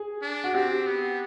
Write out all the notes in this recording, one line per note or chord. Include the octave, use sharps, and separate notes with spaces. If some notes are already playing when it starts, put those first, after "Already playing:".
Already playing: G#4
D4
F#4
C4 G4
B3